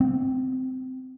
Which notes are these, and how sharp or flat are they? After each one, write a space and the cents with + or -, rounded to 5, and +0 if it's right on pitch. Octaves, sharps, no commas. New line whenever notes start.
C4 -20